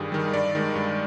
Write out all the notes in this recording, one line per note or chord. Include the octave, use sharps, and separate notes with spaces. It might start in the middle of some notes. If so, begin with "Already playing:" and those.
Already playing: G2 D#3 G3 G#4
D#3 G3
G2 D5
D#3 G#3
G2